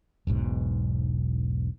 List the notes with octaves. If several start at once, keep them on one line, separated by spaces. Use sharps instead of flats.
E1 B1 G#2 B2